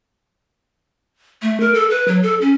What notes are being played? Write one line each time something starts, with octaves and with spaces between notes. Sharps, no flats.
A3
A#4
A4
B4
F#3
A4
C#4